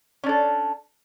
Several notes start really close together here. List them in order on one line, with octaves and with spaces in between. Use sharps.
C#4 D4 A4